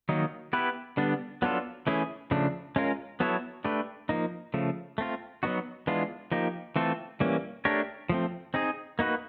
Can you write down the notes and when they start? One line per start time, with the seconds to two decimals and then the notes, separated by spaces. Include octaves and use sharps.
0.09 D#3 F#3 A#3 D#4
0.53 B3 E4 G4 B4
0.97 D3 G3 B3 D4
1.42 F#3 B3 D4 F4 A4
1.87 E3 A3 C#4 E4 G#4
2.31 C#3 F3 A3 D4
2.76 G#3 C#4 F4 A#4
3.20 F#3 B3 E4 A4 C#5
3.65 A3 D4 G4 B4
4.09 F3 A#3 D#4
4.54 C#3 F3 A3
4.98 A3 C4 F4
5.43 F#3 B3 D#4 F#4
5.87 E3 G#3 B3 D4 F4
6.32 F3 A#3 D#4 G4
6.76 E3 A3 C4 F4 A4
7.20 E3 G3 A#3 C#4
7.65 A3 D4 G4 A#4 C#5
8.09 F3 A3 C4
8.54 C4 D#4 G#4
8.99 A#3 D#4 F#4 B4